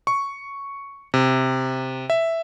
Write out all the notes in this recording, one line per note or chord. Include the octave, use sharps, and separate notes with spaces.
C#6
C3
E5